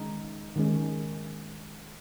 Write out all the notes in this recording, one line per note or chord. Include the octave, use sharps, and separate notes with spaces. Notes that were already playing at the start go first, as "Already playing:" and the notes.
Already playing: D#3 G#3 C#4 D#4
D#3 G#3 C#4